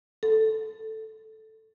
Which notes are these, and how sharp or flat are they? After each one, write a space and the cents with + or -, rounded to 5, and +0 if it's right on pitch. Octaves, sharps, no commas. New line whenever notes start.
A4 -5